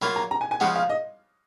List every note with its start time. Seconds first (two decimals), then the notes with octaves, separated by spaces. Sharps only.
0.01 F#3 A#3 F4 B5
0.16 A#5
0.31 A#5
0.41 G#5
0.51 G#5
0.60 C#3 F3 G#3 B3 F#5
0.76 F5
0.89 D#5